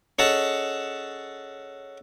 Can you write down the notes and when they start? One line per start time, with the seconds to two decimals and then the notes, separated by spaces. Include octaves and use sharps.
0.19 C#4 G#4 A4 D#5 F#5 A5